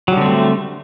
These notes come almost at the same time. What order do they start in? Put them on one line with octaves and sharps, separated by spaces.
F#3 G3 D3 C4 A3